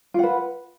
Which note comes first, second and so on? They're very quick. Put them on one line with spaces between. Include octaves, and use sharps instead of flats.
F4 F#5 B4